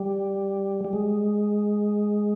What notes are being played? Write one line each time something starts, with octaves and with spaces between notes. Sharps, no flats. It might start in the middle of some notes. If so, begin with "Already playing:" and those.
Already playing: G3
G3
G#3